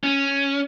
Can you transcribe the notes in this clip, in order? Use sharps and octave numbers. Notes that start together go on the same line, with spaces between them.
C#4